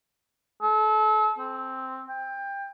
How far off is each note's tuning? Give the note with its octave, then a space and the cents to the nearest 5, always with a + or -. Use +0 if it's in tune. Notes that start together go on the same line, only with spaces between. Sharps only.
A4 -35
C4 +0
G5 +20